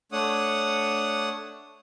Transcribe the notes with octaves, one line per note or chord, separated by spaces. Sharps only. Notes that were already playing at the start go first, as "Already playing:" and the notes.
A3 D4 C#5 F#5 D#6